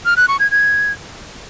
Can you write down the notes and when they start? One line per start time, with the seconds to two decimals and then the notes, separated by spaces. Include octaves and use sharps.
0.05 F6
0.17 F#6
0.28 C#6
0.40 G#6
0.51 G#6